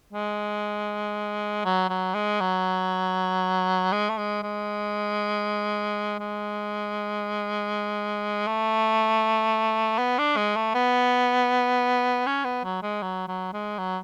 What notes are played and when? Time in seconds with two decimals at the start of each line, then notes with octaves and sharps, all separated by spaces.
0.13 G#3
1.65 F#3
1.89 F#3
2.14 G#3
2.40 F#3
3.92 G#3
4.09 A3
4.17 G#3
4.42 G#3
6.19 G#3
8.47 A3
9.98 B3
10.18 D4
10.36 G#3
10.56 A3
10.74 B3
12.26 C#4
12.44 B3
12.64 F#3
12.82 G#3
13.02 F#3
13.28 F#3
13.53 G#3
13.78 F#3